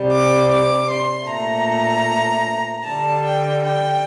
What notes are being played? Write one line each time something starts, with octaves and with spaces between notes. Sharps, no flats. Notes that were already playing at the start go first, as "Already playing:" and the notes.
Already playing: C3 G3
D6
D6
C6
A#2 A3 A#5
D3 G3 A5
G5
G5